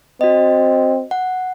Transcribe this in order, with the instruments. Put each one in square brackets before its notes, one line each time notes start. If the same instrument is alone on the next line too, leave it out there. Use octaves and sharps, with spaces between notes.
[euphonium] C4 [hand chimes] F#4 D#5
[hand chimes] F#5